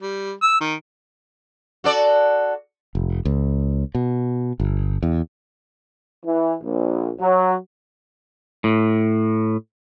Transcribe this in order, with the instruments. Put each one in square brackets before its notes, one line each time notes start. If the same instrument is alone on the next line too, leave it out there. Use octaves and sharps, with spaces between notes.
[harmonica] G3
E6
D#3
[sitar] F#4 A4 D5
[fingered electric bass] F1
C#2
B2
G1
E2
[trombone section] E3
A#1
F#3
[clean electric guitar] A2